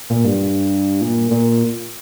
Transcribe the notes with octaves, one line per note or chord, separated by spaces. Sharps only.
A#2
G2
A#2
A#2